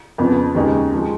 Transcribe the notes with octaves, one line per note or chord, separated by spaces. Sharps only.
F2 C#3 F3 B3
D#2 C#3 G#3 D#4
F3 G#3